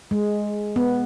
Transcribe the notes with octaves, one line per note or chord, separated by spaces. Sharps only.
G#3
B3